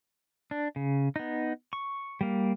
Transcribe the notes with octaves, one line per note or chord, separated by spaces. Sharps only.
D4
C#3
B3 D#4
C#6
G3 A#3